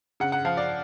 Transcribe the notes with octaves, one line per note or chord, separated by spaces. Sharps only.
C#3 F#5
F#5
F3 F5
D5